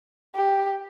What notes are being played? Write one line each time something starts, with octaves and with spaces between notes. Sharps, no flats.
G4